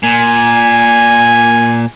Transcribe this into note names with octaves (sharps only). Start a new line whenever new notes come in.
A#2 G#5